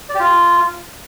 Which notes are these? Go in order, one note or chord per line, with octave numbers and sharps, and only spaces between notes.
D5
G4
F4